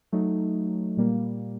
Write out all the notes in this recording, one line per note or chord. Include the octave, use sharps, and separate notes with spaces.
F#3 A3 D#4
A#2 G3 A#3